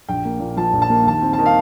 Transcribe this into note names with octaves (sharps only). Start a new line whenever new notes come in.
A#1 G5
A#3
A#2
F3 A5
A#1
A5
A#3
D#2 A5
C4
A5
D#3
F5